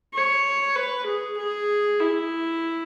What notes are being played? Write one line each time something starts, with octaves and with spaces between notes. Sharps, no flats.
C#5
B4
G#4
G#4
E4